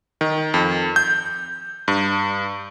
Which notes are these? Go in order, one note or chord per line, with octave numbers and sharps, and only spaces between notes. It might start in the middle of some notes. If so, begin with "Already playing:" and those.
D#3
F2
G6
G2